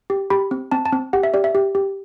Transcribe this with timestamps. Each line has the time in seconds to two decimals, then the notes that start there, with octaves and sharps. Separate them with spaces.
0.10 G4
0.30 G4 B5
0.51 C4
0.72 C4 A5
0.85 A5
0.93 C4
1.13 G4 F#5
1.23 E5
1.34 G4 D5
1.44 E5
1.55 G4
1.75 G4